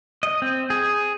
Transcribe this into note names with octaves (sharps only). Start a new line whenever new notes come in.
D#5
C4
G#4